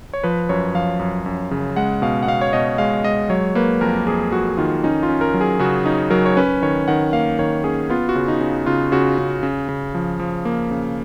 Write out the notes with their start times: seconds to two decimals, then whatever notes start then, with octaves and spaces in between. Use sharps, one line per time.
0.13 C#5
0.24 F3 B4
0.49 F#2 C#5
0.75 F3 F5
0.99 F#2
1.26 F#2
1.51 C#3
1.76 G#3 F#5
2.02 B2 F5
2.23 F#5
2.27 B2 F5
2.41 C#5
2.53 B2 D#5
2.78 G#3 F5
3.04 G#3 D#5
3.30 F#3 C#5
3.55 A#3 B4
3.81 F2 A#4
4.07 F2 G#4
4.32 F2 F#4
4.57 D#3 F4
4.84 C#4 D#4
5.03 F4
5.09 C#4
5.21 A#4
5.34 F#3
5.41 G#4
5.59 C#3 F#4
5.85 C#4 D#4
6.11 F#3 A#4
6.26 C#5
6.37 C#4 B4
6.62 D#3 C#5
6.88 D#3 F#5
7.13 A#3 F5
7.39 D#3 C#5
7.64 C#4 G#4
7.90 B3 F4
8.09 F#4
8.15 C#3
8.28 D#4
8.41 C#3
8.66 C#3 F4
8.92 C#3 F#4
9.18 C#3
9.43 C#3
9.69 C#3
9.95 F3
10.20 F3
10.45 A#3
10.71 C#3